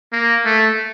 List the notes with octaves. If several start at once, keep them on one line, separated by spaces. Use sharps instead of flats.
A#3
A3